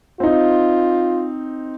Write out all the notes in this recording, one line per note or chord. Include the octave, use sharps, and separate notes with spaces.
C4 D#4 F4